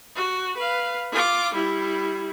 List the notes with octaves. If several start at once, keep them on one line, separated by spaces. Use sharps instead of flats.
F#4
B4 F5
F4 D6
G3 E4